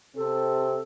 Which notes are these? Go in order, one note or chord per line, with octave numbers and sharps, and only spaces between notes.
C3 C4 A4